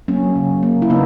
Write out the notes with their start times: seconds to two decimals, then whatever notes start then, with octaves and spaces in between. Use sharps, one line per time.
0.08 F#3 A#3 C#4
0.36 C#3
0.63 A#3
0.82 E4
0.90 C#3 B3 D#4